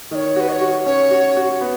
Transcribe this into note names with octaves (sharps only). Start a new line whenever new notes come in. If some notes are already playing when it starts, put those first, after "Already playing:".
D#3 C#5 D#5
F#4 B4
D#5
C#5
F#4
C#4 C#5
F#4
F#4
B3